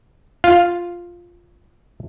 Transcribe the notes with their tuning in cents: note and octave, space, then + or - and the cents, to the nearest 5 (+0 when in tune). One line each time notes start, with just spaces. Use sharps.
F4 +0 F5 +0